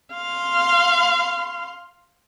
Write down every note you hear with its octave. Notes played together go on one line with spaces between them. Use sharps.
F5 C6